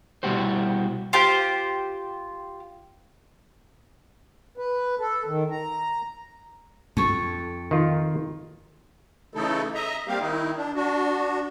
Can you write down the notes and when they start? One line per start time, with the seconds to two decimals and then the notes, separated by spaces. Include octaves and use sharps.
0.23 B2 G3 E4 F#4 G4 C5
1.13 F4 G4 C5
4.58 B4
4.99 A4
5.26 D#3
5.51 A#5
6.97 F2 A4 C#6
7.71 D#3 F4
9.34 C#3 E3 A3 D#4 E4 A4
9.75 D#5 E5 A#5
10.08 G3 A#3 C4 G4 F5
10.20 D#3 D#4 E4
10.56 D4
10.75 D4 F#4